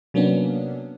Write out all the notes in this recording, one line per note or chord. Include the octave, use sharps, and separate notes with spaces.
C3 F#3 A#3 B3 C#4 D4